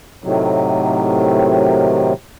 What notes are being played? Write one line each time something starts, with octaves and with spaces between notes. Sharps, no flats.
A2 C3 D#3 F#3